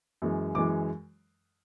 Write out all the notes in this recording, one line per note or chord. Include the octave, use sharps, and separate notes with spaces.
F#2 E3 G#3
F#2 E3 G#3 D6